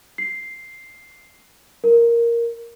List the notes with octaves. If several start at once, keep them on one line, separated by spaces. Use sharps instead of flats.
C7
A#4